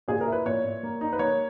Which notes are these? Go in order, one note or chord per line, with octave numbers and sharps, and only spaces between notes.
A#2 G#4
A#4
E4
B4
A#2 C#5
A#2
A#3
D#4
B4
A#3 C#5